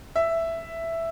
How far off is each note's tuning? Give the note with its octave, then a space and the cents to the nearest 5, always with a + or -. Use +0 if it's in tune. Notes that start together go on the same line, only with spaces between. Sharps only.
E5 +5